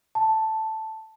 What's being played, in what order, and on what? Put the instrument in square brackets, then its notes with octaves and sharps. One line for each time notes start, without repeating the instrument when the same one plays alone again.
[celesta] A5